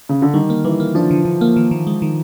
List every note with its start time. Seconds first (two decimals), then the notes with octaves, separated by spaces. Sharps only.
0.09 C#3
0.22 D3
0.34 D#3 G3
0.50 A#3
0.64 E3 G3
0.80 A#3
0.95 F3 D4
1.11 D3
1.25 D3
1.41 A#3
1.56 D#3
1.71 D#3
1.87 G#3
2.02 D#3